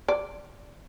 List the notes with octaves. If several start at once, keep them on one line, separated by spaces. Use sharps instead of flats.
D5